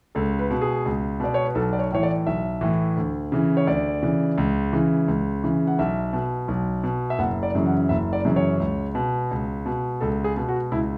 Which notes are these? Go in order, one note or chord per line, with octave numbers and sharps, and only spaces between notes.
C#2 A4
B4
B2
G#4
C#2
B2 D5
C#5
B4
B1 A4
D5
C#5
A2 E3 C#5
D5
B1 E5
A2 E3
D2
C#3 E3
C#5
D2 D5
C#3 E3
C#2
C#3 E3
C#2
C#3 E3
F#5
B1 E5
B2
B1
B2
E5
F#1 F#5
D5
F#2 C#3 E3
F#5
F#1 E5
D5
F#2 C#3 E3
C#5
C#2
B2
C#2
B2
C#2 A4
G#4
B2
F#4
C#2 E4